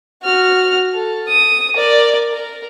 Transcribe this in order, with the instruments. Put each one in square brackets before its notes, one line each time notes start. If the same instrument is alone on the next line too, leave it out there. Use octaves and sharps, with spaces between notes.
[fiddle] F#4 F6
A4
D#6
A#4 D5
A#4